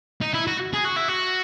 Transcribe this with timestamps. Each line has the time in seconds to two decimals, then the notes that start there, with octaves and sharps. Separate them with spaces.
0.21 D#4
0.34 E4
0.47 F#4
0.74 G#4
0.85 F#4
0.97 E4
1.08 F#4